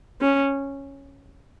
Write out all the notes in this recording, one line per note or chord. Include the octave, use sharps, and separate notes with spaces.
C#4